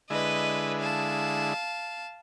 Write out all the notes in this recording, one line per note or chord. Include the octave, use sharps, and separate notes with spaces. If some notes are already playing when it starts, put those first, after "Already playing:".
D3 G#3 E4 B4 D#5
F5 A5